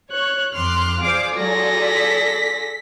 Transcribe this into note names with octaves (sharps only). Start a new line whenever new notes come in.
C#5 F#6
F2 C6 D6 F6 F#6
F4 G#4 C5 D5 F5 D6
F#3 A4 A#6
B6